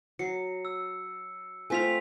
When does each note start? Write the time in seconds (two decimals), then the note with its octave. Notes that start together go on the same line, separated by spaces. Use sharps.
0.19 F#3 C7 C#7
0.65 E6
1.70 A3 C4 F4 G#5 B6 F7